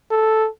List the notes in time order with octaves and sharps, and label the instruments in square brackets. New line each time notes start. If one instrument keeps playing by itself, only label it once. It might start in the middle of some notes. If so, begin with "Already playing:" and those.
[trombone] A4